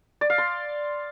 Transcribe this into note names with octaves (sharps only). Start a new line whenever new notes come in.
D5
F5
C6